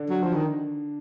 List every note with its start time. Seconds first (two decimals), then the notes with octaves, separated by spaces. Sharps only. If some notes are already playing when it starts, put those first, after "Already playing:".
Already playing: D3 D4
0.10 F#3
0.23 F3
0.34 D#3